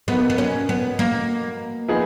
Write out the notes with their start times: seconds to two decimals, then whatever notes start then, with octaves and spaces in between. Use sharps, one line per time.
0.08 B2 F#3 A#3 B3 D#4
0.30 B3
0.38 C#4
0.69 B3
0.99 A#3
1.88 F3 B3 D#4 G#4